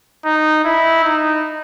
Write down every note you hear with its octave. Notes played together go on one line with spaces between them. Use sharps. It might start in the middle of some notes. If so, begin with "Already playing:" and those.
D#4
E4
D#4